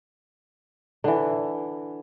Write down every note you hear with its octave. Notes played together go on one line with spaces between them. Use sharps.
D3 E3